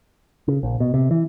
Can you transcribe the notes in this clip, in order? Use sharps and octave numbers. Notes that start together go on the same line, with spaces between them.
C#3
A#1
B2
C3
E3